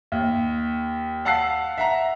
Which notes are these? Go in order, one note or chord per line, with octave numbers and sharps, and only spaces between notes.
D#2
F5 F#5 A5 E6 F#6 C7
E5 F#5 A#5